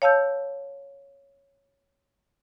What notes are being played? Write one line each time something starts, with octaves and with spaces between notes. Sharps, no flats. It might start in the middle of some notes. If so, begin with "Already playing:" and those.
C#5 F5 A5 E6 G6